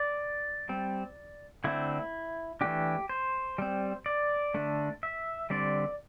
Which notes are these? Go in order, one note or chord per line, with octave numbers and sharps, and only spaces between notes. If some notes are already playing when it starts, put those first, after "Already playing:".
Already playing: D5
G3 C4
D3 A3 C4 E4
E3 A3 D4 G4
C5
G3 C4
D5
D3 A3 D4
E5
D3 G3 C4 D5